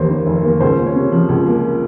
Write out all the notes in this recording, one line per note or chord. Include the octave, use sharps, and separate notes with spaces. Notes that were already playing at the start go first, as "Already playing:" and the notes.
Already playing: F1 D#2 A#3 C5 C#5
D#3
F1
A#3
C#2 C5
A#3
C#5
C3
F3
C#2
A#3